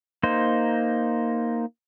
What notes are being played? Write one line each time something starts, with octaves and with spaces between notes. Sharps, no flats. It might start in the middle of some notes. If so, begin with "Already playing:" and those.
A#3 D#4 C5